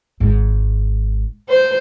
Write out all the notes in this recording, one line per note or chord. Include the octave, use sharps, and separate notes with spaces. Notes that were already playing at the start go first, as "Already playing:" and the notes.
G#1 G#2
C5